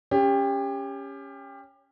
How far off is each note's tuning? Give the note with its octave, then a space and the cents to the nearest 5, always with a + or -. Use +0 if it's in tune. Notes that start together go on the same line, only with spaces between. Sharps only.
C#4 +0 G4 +25